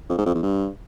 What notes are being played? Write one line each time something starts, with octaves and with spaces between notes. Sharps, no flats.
F2
G#2
F2
E2
G2